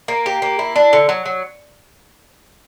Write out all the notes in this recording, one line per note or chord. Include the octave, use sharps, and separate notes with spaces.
A#3
G4
A#3
E4
D4
D3
F#3
F#3